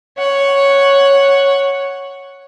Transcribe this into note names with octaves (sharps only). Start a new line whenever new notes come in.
C#5 F#5